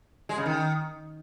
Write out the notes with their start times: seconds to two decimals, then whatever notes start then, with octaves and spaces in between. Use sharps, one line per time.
0.29 G#3
0.37 C#3
0.46 D#3